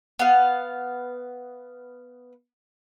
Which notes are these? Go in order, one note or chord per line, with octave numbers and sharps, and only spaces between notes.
B3 F5